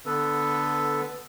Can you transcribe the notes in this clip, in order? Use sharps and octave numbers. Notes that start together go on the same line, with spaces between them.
D3 B3 A4 B4